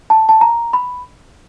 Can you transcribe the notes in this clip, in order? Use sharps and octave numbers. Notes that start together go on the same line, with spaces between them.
A5
A5
A#5
B5